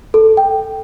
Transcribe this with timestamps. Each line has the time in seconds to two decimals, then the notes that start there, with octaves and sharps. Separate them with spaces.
0.14 A4
0.37 G5